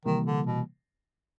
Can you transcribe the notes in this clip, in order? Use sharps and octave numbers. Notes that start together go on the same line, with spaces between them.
C3 D#3 E3 G3 A#3
D3
B2